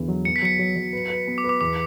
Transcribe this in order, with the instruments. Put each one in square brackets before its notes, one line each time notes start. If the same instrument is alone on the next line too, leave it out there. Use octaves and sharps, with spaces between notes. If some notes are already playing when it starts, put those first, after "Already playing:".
Already playing: [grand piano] E2 D3 B3
F#3
[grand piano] B3 [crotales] C#7
[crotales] B6
[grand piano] F#3 [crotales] C#7
[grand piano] F#3
F#3
B4
B4
B3
[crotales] D6
[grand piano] B4
[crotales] D6
[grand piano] E2 [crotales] D6